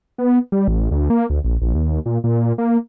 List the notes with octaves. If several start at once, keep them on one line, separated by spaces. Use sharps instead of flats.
B3
G3
A1
D2
A#3
D2
A#1
A#1
D#2
A#2
A#2
A#3